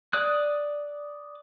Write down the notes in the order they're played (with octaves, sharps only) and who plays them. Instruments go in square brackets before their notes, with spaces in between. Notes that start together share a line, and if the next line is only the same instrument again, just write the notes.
[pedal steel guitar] D5 D#6 F#6